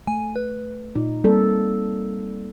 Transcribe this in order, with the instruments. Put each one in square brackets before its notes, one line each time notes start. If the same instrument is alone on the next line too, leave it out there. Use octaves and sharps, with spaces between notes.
[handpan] A3 [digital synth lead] G#5
[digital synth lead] B4
[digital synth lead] A#2 [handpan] D#4
[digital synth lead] G3 [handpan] A#3 C4 A4